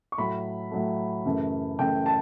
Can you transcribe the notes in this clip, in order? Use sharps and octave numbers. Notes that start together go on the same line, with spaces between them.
C#6
A2 F#3 A3 B5
A2 F#3 A3
F#2 C#3 E3 A3
F#2 C#3 E3 A3 G5
A5